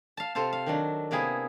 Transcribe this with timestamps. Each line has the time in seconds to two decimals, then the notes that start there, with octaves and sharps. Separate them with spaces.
0.17 F5 A5
0.35 C3 F4 A4 C5 F5
0.53 F5
0.66 D#3 F#3 D4
1.11 C3 A#3 B3 E4 G#4